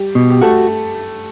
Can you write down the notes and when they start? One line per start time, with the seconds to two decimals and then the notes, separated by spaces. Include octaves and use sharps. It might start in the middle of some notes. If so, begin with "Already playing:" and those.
Already playing: G3 G4
0.15 B2
0.30 G4
0.41 A3 F#4 A4